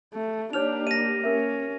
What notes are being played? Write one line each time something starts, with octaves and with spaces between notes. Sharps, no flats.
A3
A#3 D4 D#4 G4 C#5 F6 F7
D#5 A#6 D#7
C#4 A#4 E5